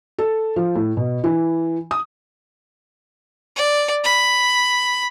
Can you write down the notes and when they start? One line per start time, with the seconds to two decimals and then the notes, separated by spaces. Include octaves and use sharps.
0.18 A4
0.56 F3
0.75 A2
0.97 B2
1.24 E3
1.91 D#6
3.56 D5
4.04 B5